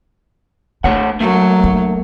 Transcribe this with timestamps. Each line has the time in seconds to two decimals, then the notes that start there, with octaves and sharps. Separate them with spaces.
0.84 A3 D4 C#5 F#5
1.20 F#3 A3 A#3
1.64 D4